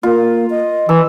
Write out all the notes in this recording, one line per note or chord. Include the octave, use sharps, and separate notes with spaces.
A#3 F4
D#5
E3 E6